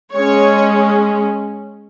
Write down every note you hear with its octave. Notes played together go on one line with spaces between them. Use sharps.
G#3 C#4 C#5